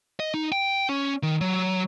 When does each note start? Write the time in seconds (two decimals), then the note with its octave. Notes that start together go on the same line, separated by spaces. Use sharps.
0.20 D#5
0.34 D#4
0.52 G5
0.89 C#4
1.23 D#3
1.41 F#3